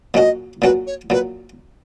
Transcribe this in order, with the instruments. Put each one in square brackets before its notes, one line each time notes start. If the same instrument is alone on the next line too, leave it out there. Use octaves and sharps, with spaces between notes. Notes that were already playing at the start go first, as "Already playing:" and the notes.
[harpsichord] A#2 F#3 C#4 F#4 [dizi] D#5
[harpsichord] A#2 F#3 C#4 F#4 [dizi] B4
[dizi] C#5
[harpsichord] A#2 F#3 [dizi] B4